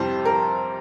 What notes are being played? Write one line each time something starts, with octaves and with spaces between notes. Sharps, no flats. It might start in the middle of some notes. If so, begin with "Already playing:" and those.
Already playing: F2 C3 G3 E4 C5
A#4